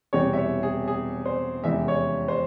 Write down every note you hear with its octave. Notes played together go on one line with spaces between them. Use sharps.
E1 E2 C3 G3 C#5
E5
C#5
G#4
G#4
C5
F1 E2 C#3 E3 G#3 E5
C#5
C5